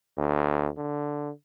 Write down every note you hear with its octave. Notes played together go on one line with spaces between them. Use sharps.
D2
D3